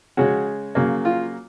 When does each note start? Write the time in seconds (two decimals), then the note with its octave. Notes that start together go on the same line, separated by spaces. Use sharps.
0.17 C#3 G#3 C#4 F#4
0.75 C#3 F#3 A#3
1.05 F4